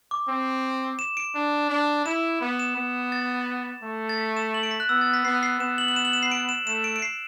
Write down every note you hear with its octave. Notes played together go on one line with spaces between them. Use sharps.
D6
C4
E7
D7
D4
D4
E4 E7
B3
E7
B3
A6
A3
A6
B6
E7
F#7
D7
B6
F#6
B3 E6
A6
B6
B3 C7
C7
B3 E7
F#7
F#7
E7
F#7
E7
C7
D7
E7
A3 E7
D7
D7
C7